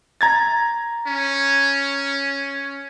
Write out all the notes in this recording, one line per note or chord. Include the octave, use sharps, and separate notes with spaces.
A#5 G#6 A6
C#4